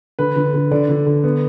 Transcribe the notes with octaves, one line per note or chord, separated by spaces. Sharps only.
D3 B4
D3
D3
D3 D5
D3
D3
B3